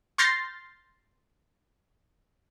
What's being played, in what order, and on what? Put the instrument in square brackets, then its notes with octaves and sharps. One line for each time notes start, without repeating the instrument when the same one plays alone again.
[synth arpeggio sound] C6 F6 G6 A6 A#6 C7